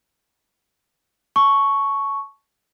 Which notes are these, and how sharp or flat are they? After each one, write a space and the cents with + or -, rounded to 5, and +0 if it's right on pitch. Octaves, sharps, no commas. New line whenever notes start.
A5 -20 C#6 +0